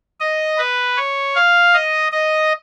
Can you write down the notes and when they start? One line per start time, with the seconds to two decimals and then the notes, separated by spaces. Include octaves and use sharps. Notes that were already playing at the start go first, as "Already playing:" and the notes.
0.20 D#5
0.58 B4
0.97 C#5
1.36 F5
1.74 D#5
2.12 D#5